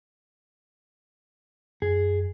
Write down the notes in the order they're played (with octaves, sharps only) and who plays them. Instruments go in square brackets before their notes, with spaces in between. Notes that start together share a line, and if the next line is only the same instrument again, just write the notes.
[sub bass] F#2 [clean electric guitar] G#4